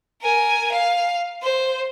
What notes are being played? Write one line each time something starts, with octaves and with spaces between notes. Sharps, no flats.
A#4 G#5
F5
C5